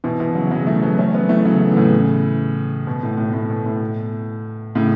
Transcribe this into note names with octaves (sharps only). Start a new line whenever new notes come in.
B2 E3
B2 E3
C#3 F#3
C#3 F#3
E3 A3
F#3 B3
A3 C#4
F#3 B3
E3 A3
C#3 F#3
E3
A2 C#3
B2
A2
A2
A2
B2
A2
A2 C#3